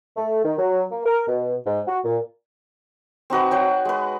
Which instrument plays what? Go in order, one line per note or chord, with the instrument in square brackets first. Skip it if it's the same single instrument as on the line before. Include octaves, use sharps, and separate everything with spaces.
[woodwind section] A3
D#3
F#3
A#3
A#4
B2
G#2
F#4
A#2
[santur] C4 D#4 F#4 B4
F#4 C#5 G5
G#3 B4